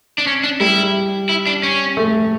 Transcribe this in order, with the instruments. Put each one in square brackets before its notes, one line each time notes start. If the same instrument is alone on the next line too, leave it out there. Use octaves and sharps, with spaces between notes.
[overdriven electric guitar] D4
C#4
D4
[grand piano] G3 [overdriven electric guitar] E4
[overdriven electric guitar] E4
D4
C#4
[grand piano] A3